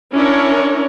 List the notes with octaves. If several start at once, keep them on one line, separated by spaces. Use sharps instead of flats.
C#4 D4 E4 A#4 C#5